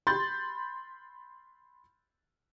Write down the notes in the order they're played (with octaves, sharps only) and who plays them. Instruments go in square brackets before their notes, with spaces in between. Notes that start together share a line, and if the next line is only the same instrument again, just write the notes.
[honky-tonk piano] B5 C6 G6 A6